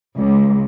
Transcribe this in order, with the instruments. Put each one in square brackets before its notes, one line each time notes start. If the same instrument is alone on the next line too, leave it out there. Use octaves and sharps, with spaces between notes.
[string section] C#2